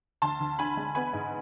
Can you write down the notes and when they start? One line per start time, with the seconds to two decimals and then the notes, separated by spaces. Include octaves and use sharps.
0.22 D2 A5 C6
0.40 D2
0.59 D3 G#5 B5
0.77 G#3
0.95 B3 G#5 B5
1.13 G#2